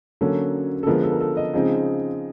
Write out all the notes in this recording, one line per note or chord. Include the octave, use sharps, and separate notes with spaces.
D3 F#3 A#3 C#4 A4
A4
D3 F3 G#3 B3 A#4
A4
A#4
A4
D#5
C#3 F3 G#3 C4 D#4